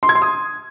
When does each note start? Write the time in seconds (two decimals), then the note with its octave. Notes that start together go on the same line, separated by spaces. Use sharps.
0.03 C6
0.09 G#6
0.15 C6
0.22 D#6